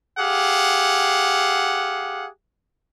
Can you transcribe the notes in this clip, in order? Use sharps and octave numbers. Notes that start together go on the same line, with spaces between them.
G4 G#4 F5 F#5